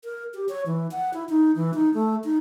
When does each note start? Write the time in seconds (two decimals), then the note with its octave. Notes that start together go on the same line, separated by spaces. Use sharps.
0.04 A#4
0.34 G4
0.49 C#5
0.66 E3
0.91 F#5
1.14 E4
1.29 D#4
1.56 E3
1.74 D#4
1.94 A3
2.24 D#4